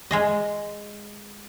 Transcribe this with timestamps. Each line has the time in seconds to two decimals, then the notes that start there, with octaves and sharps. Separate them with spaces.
0.11 G#3 G#4 D#5